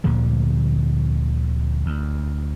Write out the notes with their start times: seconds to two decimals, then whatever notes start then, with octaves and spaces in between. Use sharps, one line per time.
0.04 D2 A#2 D3 F3
1.86 D2